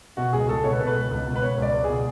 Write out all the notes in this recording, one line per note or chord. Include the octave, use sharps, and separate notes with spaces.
B2 F#4
C#2 G#4
C#2 A4
B2 C#5
B4
B2 A4
B4
C#2
C#2
B2
B4
B2 C#5
C#2 D5
C#2
B2 G#4